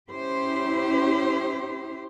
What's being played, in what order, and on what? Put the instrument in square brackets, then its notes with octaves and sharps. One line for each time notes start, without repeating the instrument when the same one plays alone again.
[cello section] C#4 E4 G4 C5